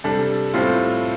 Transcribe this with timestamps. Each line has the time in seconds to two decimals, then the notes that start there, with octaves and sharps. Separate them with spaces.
0.04 C3 G3 D4 A4
0.54 A2 G3 C4 F4 A4